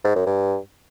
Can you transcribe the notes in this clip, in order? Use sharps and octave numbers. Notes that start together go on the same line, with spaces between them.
G#2
F#2
G2